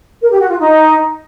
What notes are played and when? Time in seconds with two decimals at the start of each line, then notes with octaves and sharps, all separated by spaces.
0.22 A#4
0.31 G4
0.40 F#4
0.49 F4
0.59 D#4